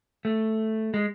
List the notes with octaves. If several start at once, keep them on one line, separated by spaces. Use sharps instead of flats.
A3
G#3